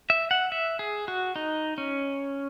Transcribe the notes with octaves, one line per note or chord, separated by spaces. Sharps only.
E5
F#5
E5
G#4
F#4
D#4
C#4